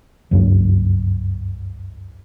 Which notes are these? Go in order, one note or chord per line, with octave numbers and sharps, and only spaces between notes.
F#1 C#2 G2 F#3